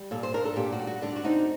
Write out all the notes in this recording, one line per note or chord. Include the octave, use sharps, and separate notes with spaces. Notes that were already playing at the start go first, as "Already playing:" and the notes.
Already playing: G3
A#2 A4
C5
D4 A#4
A4
A#2 G4
F#4
G3
F#4
D3 D4
F#4
C4 D#4